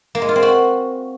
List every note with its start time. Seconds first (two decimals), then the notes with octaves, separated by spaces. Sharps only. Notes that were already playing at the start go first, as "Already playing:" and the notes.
0.15 A#3
0.22 G#3
0.29 F4
0.36 C4
0.42 F#4